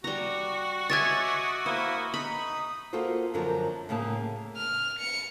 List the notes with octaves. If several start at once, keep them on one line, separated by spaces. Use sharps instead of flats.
G3 F#4 A#5
C#5 D#5 E5 G#5 D6 G#6 A6
A#3 E4 C5 D#6
D#4 B5 D#6
A#3 F4 F#4 A4 C5
F#2 D3 F3 F#3 A#4
A2 C#3 A#3 G#4 A5
F6
C#7